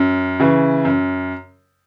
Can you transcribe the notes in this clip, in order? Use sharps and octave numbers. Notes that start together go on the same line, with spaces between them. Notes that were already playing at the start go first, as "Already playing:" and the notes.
Already playing: F#2
C#3 E3
F#2